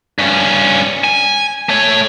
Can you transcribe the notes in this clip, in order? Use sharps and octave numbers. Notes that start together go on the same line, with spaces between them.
G2 C#4
G#5
A3 C#5